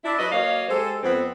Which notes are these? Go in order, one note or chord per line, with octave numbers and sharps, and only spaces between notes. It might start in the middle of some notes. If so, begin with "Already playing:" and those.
D4 E4
F#3 F#4 B4 D#5
F#3 A#3 C#5 D#5 F5
G#3 G4 A4 C5
F2 B3 C4